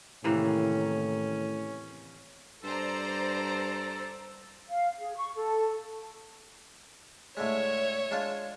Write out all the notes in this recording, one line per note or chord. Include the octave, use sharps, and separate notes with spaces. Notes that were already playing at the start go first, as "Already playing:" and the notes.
A2 C3 D#3 E3 A#3 C#4
G2 A4 C5 D5 A#5
F5
G#4
C#6
A4
A2 D3 G#3 C#5 E5
G#3 D4 F4